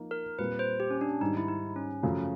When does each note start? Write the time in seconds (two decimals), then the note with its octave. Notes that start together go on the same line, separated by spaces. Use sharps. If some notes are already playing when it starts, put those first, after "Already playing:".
Already playing: F3 A#3 D#4
0.11 A#4
0.39 A#2 G3 C4 F4 B4
0.59 C5
0.80 G4
0.91 C#4
1.01 D4
1.21 G#2 D#3 G3 D#4
1.37 E4
1.48 D#4
1.76 C#4
2.03 F#2 C#3 F3 A3